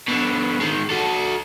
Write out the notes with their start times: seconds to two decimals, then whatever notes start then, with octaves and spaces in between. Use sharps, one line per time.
0.08 B2 D3
0.61 D#3 G#3
0.90 F#4 A4